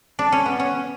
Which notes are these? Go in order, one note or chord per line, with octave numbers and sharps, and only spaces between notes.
D4
C#4
B3
C#4